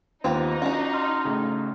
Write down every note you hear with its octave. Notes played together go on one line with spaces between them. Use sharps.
D#2 B3 C4 D#4 F4 G4
C#4 D4 F4 F#4
C6 F6
A2 C#3